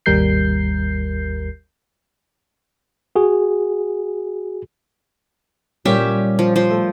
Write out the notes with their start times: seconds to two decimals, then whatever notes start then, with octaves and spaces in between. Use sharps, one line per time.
0.06 G#1 D#2 G3 A#4 G6 C7
3.16 F#4 G#4
5.85 A#2 G3 C#4 G4 E5
6.39 F3
6.56 F3 C5
6.70 A3